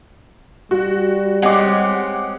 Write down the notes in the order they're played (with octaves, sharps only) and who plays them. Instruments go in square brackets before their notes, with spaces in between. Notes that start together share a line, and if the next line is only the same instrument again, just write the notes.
[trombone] G3 [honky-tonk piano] F#4
[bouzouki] G#3 C4 C#4 [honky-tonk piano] F#5 D6